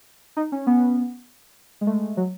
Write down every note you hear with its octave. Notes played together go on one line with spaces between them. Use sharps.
D#4
C#4
B3
G#3
A3
F#3